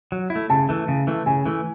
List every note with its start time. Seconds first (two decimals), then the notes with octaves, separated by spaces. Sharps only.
0.12 F#3
0.30 E4
0.36 A3
0.50 C#3 A5
0.69 E3 A3
0.88 C#3
1.07 E3 A3
1.26 C#3 G#5
1.46 E3 A3